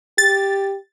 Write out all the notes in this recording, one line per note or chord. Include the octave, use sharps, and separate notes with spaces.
G4 A6